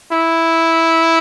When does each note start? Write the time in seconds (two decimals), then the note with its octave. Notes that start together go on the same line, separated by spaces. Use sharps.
0.12 E4